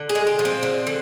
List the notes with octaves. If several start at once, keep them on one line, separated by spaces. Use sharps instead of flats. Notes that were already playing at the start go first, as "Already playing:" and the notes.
Already playing: D3
G#4
G#3
G4
F3
C4
D3
D3